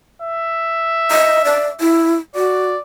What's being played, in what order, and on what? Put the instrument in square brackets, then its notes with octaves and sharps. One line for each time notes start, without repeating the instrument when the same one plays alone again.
[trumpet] E5
[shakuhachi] D#5
D5
E4
[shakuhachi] F#4 [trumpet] D5